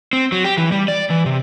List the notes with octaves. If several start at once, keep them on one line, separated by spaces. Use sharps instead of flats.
C4
F#3
G4
E3
G3
D5
E3
C3